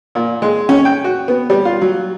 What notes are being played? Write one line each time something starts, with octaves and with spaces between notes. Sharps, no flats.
A#2
G#3
C#4
G5
F#4
B3
G3
F4
F#3